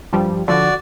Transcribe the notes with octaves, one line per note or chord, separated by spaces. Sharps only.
G2 F3 G3
D3 F3 F#4 D5